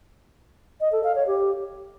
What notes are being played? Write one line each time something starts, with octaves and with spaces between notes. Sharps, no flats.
D#5
A4
F5
C#5
G4